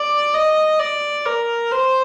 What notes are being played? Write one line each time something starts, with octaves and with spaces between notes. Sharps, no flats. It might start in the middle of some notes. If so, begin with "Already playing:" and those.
Already playing: D5
D#5
D5
A#4
C5